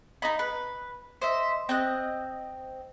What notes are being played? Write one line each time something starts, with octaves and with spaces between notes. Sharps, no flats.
D#4 D#5 B5
B4
C5 D#5 E5
C4 D#5 F#6